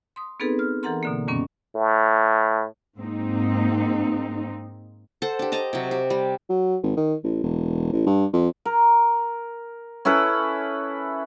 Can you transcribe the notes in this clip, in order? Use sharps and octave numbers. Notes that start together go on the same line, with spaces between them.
C6 D#6
B3 C4 D#4 G#4 A4 B4
F6
E3 A4 A#4 F#5 A#5 C6
B2 D3 A#3
F#2 A#2 D#3 G3 B3 C#4
A2
G#2 A#3 C4 D#4
A4 C5 F#5
D4 G4
D#5 A5 A#5
C3 F#3
G4
G3
F#3
G#1
D#3
A1
E1
A1
G2
F2
A#4
C#4 E4 A4 B4